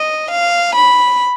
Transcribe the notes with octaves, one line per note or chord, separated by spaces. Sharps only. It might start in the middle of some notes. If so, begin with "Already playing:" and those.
Already playing: D#5
F5
B5